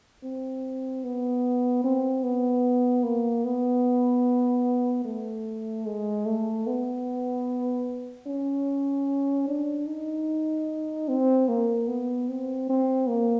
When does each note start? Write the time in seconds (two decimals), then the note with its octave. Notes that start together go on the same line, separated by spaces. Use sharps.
0.24 C4
1.04 B3
1.84 C4
2.24 B3
3.04 A#3
3.45 B3
5.05 A3
5.87 G#3
6.26 A3
6.67 B3
8.27 C#4
9.48 D4
9.87 D#4
11.09 C4
11.48 A#3
11.88 B3
12.29 C4
12.70 C4
13.08 A#3